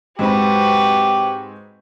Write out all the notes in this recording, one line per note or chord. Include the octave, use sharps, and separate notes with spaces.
G#2 C4 F#4 G4 B4 B5